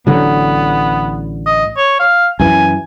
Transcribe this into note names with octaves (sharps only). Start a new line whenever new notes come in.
A1 D3 F#3 B3
D#5
C#5
F5
F#2 E3 G#5